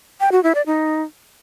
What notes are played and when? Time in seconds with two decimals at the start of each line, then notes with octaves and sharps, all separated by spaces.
0.20 G5
0.32 F#4
0.43 E4
0.55 D5
0.66 D#4